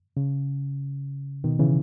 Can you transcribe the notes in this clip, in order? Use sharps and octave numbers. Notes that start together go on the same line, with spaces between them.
C#3
B2 D#3
C#3 E3